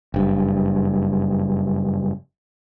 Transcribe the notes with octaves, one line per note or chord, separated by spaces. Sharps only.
F#1 G2